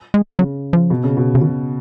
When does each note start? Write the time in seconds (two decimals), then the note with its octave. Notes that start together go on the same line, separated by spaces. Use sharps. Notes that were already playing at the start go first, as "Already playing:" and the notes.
0.14 G#3
0.39 C#3 F#3
0.73 F3
0.90 B2
1.04 C#3
1.17 B2
1.35 C#3
1.42 B2 D#3